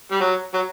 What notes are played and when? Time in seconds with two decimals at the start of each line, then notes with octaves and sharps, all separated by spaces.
0.11 G3
0.21 F#3
0.54 F#3